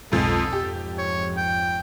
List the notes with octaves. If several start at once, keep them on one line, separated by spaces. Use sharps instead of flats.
B1 F2 G#2 A4
F2 G#2 G4
C#5
G5